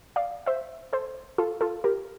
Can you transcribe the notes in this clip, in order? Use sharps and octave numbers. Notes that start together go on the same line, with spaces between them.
D5 F5
C5 E5
A4 C5
F4 A4
F4 A4
G4 A#4